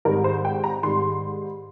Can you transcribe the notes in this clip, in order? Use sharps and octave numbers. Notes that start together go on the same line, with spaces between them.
G#2 D#3 G3 A#4
C5
G5
A#5
G#2 D#3 G3 C6